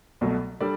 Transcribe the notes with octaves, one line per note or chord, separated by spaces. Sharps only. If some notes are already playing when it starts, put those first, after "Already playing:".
C2 B2 F#3 A3
G3 D4 A4 D5